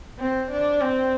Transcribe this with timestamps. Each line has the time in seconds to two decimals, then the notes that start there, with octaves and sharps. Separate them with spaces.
0.19 C4
0.51 D4
0.81 C4